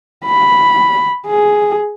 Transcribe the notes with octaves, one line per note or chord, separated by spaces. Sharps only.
B5
G#4